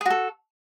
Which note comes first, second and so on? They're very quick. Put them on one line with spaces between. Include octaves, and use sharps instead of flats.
G#4 F#4 A4